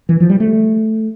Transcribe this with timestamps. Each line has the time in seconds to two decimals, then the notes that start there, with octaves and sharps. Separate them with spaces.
0.09 E3
0.20 F3
0.30 G3
0.40 A3